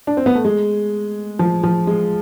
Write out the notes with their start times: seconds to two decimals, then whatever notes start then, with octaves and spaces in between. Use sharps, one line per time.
0.07 D4
0.17 C4
0.26 B3
0.35 A3
0.45 G#3
1.39 F3
1.63 F3
1.87 G#3